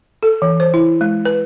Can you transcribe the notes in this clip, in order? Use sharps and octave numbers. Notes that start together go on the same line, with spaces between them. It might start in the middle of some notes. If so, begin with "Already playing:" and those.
A4
E3
C5
E4
G#3
B4